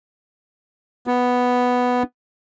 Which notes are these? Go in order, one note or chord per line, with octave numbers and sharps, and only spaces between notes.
B3